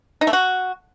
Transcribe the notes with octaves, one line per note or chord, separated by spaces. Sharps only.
D#4
A3
F#4